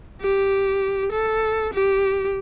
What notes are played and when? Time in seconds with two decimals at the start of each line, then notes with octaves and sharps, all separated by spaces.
0.21 G4
1.12 A4
1.73 G4